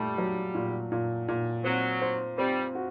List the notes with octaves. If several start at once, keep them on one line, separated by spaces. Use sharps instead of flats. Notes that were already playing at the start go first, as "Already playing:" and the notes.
Already playing: A#2 G3 A3
F#3
A#2
A#2
A#2
F#3 C4
C5
G3 C4
F#4